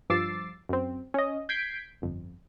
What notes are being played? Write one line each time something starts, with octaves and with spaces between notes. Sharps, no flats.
G2 F3 D6 E6 A6 C7
F#2 C4
C#4 D#5
G6 G#6 B6 C7 D7
G1 F2